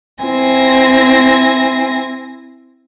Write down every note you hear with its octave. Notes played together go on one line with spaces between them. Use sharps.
C4 E4 G#5 A#6